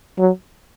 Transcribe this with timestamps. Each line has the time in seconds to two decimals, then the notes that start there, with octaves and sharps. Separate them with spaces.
0.19 F#3